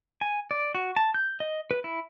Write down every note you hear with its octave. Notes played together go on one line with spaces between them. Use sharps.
G#5
D5
F#4
A5
G6
D#5
B4
E4